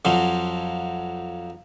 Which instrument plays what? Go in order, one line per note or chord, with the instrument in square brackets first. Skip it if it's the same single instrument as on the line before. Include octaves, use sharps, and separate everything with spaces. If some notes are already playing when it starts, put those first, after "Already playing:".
[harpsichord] F2 F3 F#3 C6